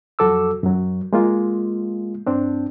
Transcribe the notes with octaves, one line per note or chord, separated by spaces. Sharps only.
F2 F#3 F#4 A4 D6 E6
F#2 F#3
G#3 A#3 F4
G2 C4 D4